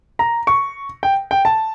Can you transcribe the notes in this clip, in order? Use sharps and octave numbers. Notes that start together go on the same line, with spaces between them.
A#5
C#6
G5
G5
A5